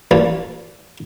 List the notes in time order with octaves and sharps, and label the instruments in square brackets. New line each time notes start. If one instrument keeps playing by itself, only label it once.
[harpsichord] A1 A#2